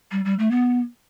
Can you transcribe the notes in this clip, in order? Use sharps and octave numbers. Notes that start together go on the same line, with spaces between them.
G3
G3
A3
B3